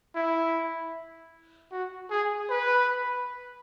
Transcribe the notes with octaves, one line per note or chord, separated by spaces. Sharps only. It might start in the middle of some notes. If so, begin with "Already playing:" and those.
E4
F#4
G#4
B4